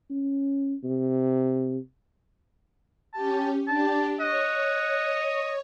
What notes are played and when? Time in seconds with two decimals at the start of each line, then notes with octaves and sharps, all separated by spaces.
0.10 C#4
0.84 C3
3.14 C#4 G4 A5
3.68 D4 G4 A5
4.20 C#5 D#5 F#5